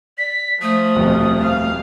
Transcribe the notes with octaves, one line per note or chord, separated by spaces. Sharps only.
D5 B6
F3 A3 D#6
D#1 F2 B2
F5